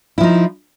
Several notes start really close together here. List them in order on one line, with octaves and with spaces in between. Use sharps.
E4 F3 D#4